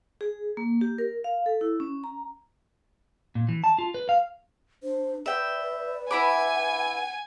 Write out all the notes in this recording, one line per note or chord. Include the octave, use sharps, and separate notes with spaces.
G#4
A#3
G4
A#4
F5
A4
E4
C#4
A#5
A#2
E3
A5
F4
B4
F5
D4 C5
B4 D5 E5 G5
E4 F#5 G#5 B5 D6